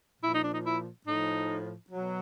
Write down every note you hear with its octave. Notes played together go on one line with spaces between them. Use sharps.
A#2 F3 E4
D#4
D4
D#4
E4
A2 F3 D#4
B2 F#3